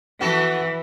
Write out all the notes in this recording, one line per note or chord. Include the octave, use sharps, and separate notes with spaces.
E3 B3 F#4 A4